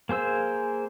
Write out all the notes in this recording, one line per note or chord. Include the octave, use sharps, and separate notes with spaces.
A#3 G#4 C5 E6